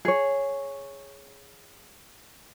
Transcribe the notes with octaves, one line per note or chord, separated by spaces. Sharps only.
G#4 C#5